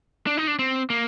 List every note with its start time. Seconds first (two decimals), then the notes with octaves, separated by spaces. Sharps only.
0.27 D4
0.37 D#4
0.47 D4
0.59 C4
0.90 A#3